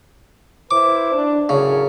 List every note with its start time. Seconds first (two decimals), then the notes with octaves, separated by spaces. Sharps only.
0.71 E4 B4 C5 D6
1.12 D4
1.49 F#2 A2 C#3 C#5